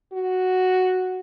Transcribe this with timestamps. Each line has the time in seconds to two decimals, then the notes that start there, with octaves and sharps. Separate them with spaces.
0.13 F#4